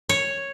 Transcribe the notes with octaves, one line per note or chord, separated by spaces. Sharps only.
C#5